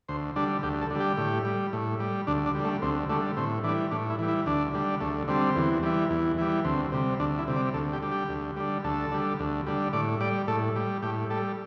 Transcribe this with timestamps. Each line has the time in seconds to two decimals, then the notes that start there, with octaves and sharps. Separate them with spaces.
0.08 D2 C5
0.36 D3 G3 D4
0.63 D2 G4
0.82 A4
0.90 D3 G3
1.00 G4
1.17 A2
1.45 G3
1.73 A2
2.00 G3
2.27 D2 D4
2.46 D4
2.55 G3
2.60 D3 A3
2.82 D2 C4
3.09 D3 G3 A3
3.37 A2 C4
3.64 E3 D4
3.68 G3
3.91 A2 D4
4.10 E4
4.19 E3 G3
4.28 E4
4.46 D2 D4
4.74 D3 G3
5.01 D2 A3
5.28 D3 G3 C4
5.56 E2
5.83 E3 G3
6.10 E2
6.38 E3 G3
6.65 D2 C4
6.92 C3 G3
7.20 D2 D4
7.38 E4
7.48 C3 G3
7.56 D5
7.74 D2 A4
7.93 G4
8.02 D3 G3
8.12 G4
8.29 D2
8.56 D3 G3
8.84 D2 A4
9.12 D3 G3
9.39 D2
9.67 D3 G3
9.93 A2 D5
10.20 G3 D5
10.47 A2 A4
10.76 G3
11.02 A2 G4
11.30 G3 A4